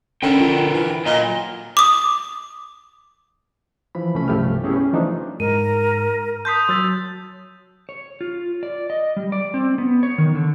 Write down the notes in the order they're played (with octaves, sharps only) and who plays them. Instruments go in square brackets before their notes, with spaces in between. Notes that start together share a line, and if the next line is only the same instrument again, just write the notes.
[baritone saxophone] D3 [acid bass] C#4 [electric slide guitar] A#4 B4 G5
[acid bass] F4
[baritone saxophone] E3
[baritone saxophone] A#2 [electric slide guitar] F#3 D#5
[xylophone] D6 D#6
[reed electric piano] E3 F3 B5
C2 A3 C#4 B5
C2 G2 F3 A3 G4 F6
A3 B3 C#4 E4 G4 G#4
C#4
E3 F3 A3 D4 D#4
[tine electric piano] G#2 G#3 [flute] A#4 [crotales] D#7
[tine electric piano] A5 C6 B6 [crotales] D#6 G6
[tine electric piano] F#3 [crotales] E6 A6
[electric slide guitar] C#5
F4
D5
D#5
G3
D5
C4
B3
C#5
D#3
D3